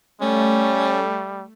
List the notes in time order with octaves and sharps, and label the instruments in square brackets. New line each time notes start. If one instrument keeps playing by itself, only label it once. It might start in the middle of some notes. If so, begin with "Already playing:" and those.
[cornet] G3 [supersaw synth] A3 [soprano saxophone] C#4